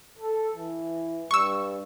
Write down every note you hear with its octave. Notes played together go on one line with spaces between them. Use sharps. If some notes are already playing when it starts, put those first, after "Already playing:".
A4
E3
G2 C#6 E6